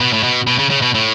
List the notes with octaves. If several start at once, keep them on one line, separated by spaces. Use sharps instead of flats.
B2
A2
B2
B2
C#3
C#3
B2
A2